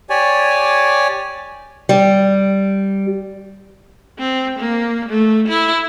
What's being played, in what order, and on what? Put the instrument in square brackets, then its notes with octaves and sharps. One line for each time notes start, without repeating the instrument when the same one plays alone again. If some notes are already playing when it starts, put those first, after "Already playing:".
[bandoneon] G4 C#5 D5 G#5
[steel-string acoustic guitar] G3
[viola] C4
A#3
A3
E4